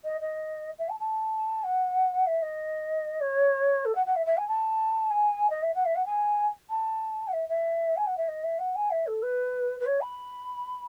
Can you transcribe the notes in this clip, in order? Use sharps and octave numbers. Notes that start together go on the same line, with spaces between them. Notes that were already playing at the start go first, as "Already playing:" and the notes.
D#5
D#5
E5
A5
A5
F#5
E5
D#5
C#5
A4
F#5
F#5
E5
E5
G#5
A5
G#5
D#5
E5
F#5
E5
F#5
G#5
A5
F#5
E5
E5
G#5
F#5
E5
D#5
E5
F#5
G#5
E5
A4
B4
B4
C#5
B5